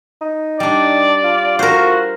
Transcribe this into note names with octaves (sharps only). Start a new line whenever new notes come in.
D#4
G3 D4 D5
F4
F#4 A#4 C5